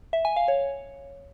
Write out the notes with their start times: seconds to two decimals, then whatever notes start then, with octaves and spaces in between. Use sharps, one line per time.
0.13 E5
0.25 G#5
0.36 F5
0.48 C#5